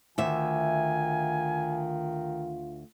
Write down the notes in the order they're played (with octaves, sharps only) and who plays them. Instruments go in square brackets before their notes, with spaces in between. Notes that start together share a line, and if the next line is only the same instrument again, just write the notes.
[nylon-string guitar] D2 E5 [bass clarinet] D#3 [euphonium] F4 [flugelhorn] G#5